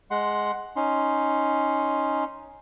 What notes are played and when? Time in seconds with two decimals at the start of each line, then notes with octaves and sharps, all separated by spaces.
0.11 G#3 F#5 C6
0.76 C#4 D#4 C6